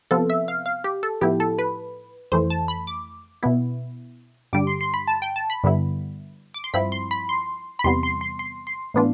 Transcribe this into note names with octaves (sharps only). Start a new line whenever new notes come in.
C3 F3 B3 F4 A4
E5
F5
F5
G4
A4
A2 F3 B3 E4 G4
A4
B4
F2 E3 A3 C5
A5
B5
D6
B2 B3 E4
G2 D3 G3 D6
C6
C6
B5
A5
G5
A5
B5
G2 D3 G3 B3 E4
D6
C6
G2 F3 C4 E4 B5
C6
B5
C6
B5
E2 C3 G3 B3 C6
C6
C6
C6
C6
A2 E3 B3 D4 F4